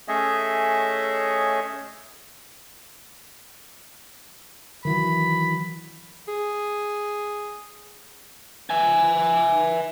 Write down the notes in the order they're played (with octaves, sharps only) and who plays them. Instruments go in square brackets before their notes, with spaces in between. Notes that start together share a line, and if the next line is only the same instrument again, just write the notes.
[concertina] A3 C#4 G#4 C#5 D#5 E5
[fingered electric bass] D#3 E3 F#3 [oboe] B5
[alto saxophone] G#4
[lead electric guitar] E5 G#5